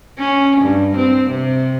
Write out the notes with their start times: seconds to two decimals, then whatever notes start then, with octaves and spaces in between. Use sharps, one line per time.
0.19 C#4
0.62 G2
0.97 C4
1.31 C3